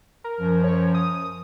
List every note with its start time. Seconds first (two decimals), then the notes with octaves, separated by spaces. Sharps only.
0.24 A#4
0.39 F#2 F3
0.64 C#5
0.94 D#6